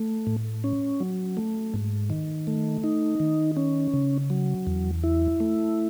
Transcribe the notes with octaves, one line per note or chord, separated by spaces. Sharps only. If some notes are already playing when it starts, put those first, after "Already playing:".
Already playing: A3
A2
C#4
F#3
A3
G#2
D#3
A3
D#4
D#3
C#4
C#3
F#3
E2
E4
A3